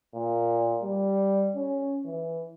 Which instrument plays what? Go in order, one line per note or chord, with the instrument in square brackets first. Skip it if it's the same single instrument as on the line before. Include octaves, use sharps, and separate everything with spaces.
[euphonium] A#2
G3
C#4
E3